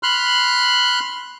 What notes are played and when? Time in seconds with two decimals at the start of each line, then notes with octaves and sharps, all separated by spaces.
0.03 B5 C6 F6 F#6